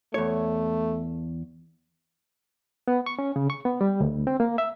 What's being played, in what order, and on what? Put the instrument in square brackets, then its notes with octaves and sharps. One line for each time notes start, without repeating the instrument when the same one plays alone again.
[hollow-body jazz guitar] E2 C#5 [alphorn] A3
[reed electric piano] B3
C#6
C#4
C#3
C#6
B3
G3
D2
C4
A#3
E5